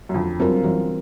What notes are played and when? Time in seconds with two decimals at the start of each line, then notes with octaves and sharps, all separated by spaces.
0.09 F#2
0.14 F2 D3
0.40 F#2 G3 C4 F4 A#4
0.64 F#2 E3